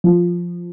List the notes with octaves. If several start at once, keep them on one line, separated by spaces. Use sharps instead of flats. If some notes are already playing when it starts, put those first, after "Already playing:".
F3